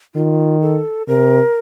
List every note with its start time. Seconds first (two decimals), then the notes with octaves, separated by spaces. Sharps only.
0.15 D#3 F4
0.61 A4
1.07 C3 A#4